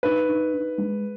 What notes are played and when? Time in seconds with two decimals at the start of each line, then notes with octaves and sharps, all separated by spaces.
0.03 D#4 B4
0.28 D#4
0.54 D#4
0.78 G#3